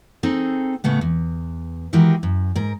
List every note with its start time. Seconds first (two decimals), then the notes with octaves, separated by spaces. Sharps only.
0.23 C4 D#4 G#4 A4
0.84 A2 C#3 A3 B3
1.01 E2
1.93 D#3 E3 G#3 F#4 G4 A#4
2.23 F#2
2.55 G#2 A#4